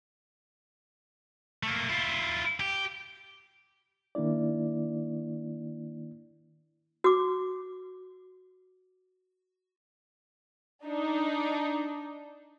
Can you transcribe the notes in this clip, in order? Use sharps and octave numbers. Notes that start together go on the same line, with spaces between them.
A3 A#3
E4 F4
G4
D#3 A#3 D4 E4 D5
F#4 D6
D4 D#4